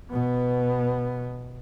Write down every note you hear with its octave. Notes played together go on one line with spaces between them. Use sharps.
B2 B3